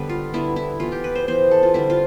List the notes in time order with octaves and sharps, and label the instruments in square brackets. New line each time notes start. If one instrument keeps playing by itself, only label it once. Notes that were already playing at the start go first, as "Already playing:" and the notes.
Already playing: [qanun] D3 G3 B3 B4
F4
D3 G3 B3 E4
E4
E3 B3 F4
G4
B4
C5
E3 B3 C5
A4
F4
D3 G3 C4 E4
F4